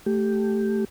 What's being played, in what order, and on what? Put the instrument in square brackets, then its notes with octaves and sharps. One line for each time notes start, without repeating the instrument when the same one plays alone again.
[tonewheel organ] A3 G4